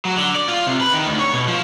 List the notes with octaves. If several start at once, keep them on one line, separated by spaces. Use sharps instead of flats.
F#3
D3
D5
F4
C3
B4
D#3
D2
C#5
B2
F3